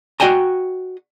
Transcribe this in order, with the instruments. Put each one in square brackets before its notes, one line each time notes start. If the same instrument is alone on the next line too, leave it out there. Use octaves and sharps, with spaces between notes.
[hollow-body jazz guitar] F#4 D#5 G5 G#5 A#5